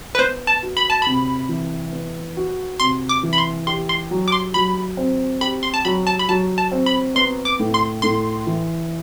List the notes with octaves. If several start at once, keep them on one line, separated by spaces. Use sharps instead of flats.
B4
B3 C5
A5
F#4
B5
A5
C3 B5
E3
B3
F#4
C3 C6
D6
E3
B5
C6
G4 C6
C6
F#3
D6
C6
F#3 B5
C4
G4 B5
C6
A5
F#3 B5
A5
B5
F#3 A5
A5
C4
B5
B3 C6
D6
A2
C6
A2 C6
E3